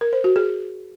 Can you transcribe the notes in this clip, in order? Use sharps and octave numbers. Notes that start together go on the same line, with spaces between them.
A#4
C5
F#4
G#4